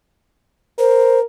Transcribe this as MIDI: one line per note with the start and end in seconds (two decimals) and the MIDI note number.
0.79 1.24 70
0.79 1.19 72